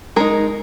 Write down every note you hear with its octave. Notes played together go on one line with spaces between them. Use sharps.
G#3 D#4 A#4